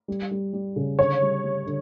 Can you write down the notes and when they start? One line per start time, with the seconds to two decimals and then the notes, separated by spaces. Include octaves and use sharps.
0.08 G3
0.31 G3
0.53 G3
0.76 C#3
0.98 D3 C#5
1.22 G3
1.44 G3
1.66 D3